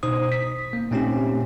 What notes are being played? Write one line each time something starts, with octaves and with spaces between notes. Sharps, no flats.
B2 D#4 C5 D#6
B6
A#3
A#2 A3 C4 C#4 D#4 G4